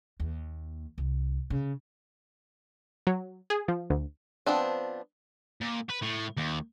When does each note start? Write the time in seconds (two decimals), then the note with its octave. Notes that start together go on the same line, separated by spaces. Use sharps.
0.20 D#2
0.98 C2
1.50 C#3
3.07 F#3
3.50 G#4
3.68 F3
3.90 D2
4.46 F3 B3 C4 D4
5.61 A#2
5.89 B4
6.02 A2
6.37 D#2